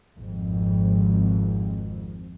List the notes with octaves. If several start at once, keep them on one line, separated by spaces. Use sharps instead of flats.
G#1 F2